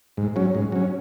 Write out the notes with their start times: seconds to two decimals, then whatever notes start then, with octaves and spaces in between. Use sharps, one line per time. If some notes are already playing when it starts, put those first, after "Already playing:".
0.17 G#2
0.36 F#3 C#4
0.55 G#2
0.72 F#3 C#4